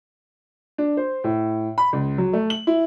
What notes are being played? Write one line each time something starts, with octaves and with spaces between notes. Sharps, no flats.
D4
C5
A2
B5
C#2
F#3
A3
F#7
E4